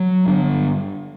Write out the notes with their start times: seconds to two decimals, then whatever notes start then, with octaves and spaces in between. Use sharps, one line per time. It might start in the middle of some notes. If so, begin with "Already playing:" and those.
Already playing: F#3
0.26 G1 G2 D3